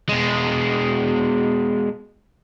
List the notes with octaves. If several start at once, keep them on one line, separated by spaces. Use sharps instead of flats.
B2 G#3